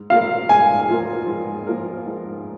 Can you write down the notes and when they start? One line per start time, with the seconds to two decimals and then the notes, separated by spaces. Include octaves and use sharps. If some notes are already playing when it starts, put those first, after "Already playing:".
Already playing: G#2
0.10 F3 A#3 F4 A#4 F5
0.49 G#2 G#5
0.88 F3 A#3 F4 A#4
1.27 G#2
1.67 F3 A#3 F4 A#4
2.06 G#2